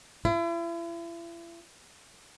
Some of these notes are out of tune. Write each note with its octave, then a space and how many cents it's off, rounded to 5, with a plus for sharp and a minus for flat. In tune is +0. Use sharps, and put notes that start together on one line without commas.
E4 +40